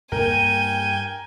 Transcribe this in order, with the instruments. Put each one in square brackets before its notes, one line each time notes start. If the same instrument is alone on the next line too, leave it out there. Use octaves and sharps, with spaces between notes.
[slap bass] G2 A#3 [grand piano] A#4 [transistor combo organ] G5 [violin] G#5